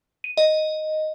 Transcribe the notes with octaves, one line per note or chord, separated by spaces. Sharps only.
D#7
D#5